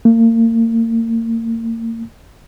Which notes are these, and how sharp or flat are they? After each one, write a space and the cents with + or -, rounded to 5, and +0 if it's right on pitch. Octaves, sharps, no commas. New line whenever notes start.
A#3 -35